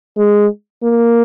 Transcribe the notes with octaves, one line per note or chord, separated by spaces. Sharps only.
G#3
A#3